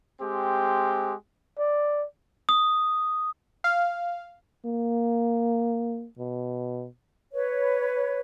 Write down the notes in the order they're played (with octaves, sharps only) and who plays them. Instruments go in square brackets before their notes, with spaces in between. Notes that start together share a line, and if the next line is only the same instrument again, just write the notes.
[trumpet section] G#3 C4 G4
[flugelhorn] D5
[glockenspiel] D#6
[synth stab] F5
[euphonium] A#3
B2
[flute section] B4 C#5